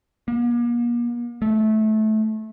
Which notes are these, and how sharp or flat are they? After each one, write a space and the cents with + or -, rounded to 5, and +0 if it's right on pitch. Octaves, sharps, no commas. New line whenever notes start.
A#3 +40
A3 -20